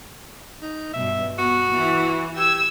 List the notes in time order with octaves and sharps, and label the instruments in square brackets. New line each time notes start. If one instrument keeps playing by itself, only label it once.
[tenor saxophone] D#4
[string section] G2 B2 [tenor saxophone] E5
[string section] B3 [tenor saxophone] F#4
[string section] E3
[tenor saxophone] G4 [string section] E6 G#6